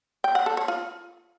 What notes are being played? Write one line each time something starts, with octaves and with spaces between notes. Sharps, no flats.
G5
F#5
A4
C#5
F4